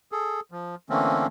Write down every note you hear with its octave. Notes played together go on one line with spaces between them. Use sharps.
G#4 A4
F3
D3 E3 A3 A#3 C4 C#4